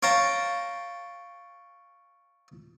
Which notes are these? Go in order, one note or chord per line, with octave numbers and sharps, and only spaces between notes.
C#5 F5 G5 A5 A#5